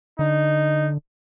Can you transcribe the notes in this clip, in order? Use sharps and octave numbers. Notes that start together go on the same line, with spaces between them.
D3 D#4